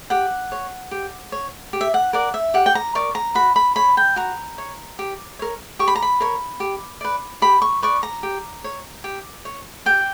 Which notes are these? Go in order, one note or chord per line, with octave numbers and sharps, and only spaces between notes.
G4 F#5
C#5
G4
C#5
G4
E5
F#5
A#4 D5 F#5
E5
G4 F#5
G5
A#5
A#4 D5 C#6
A#5
F#4 B5
B5
C#5 B5
G5
F#4 A#5
C#5
G4
A#4 C#5
G4 C#6
B5
A#5
B5
A#4 C#5
G4
B4 D5
G4 B5
C#6
B4 D5 C#6
A#5
G4
C#5
G4
C#5
G4 G5